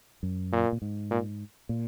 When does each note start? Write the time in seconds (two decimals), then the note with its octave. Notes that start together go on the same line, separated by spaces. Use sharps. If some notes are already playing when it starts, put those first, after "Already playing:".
0.23 F#2
0.52 A#2
0.72 A#2
0.82 G#2
1.10 A#2
1.69 A#2